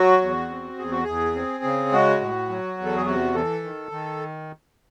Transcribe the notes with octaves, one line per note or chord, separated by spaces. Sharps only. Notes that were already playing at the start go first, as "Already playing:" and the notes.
Already playing: F#3 F#4
E2
C4
E2 G#4
F#4
E2 G#4
C4
C#3
G#3 F#4
A2
F#3
E2
A4
G#4
C3 F#4
E3 A4
D#3
D#3